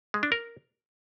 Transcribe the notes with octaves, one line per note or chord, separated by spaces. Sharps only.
G#3
D4
A#4